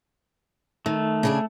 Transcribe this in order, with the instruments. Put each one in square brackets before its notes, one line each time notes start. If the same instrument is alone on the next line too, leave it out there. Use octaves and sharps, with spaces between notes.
[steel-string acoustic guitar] D#3 [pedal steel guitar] A3
[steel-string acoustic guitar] C#3 D4 G#4